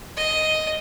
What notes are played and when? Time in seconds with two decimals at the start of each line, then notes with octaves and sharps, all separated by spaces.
0.17 D#5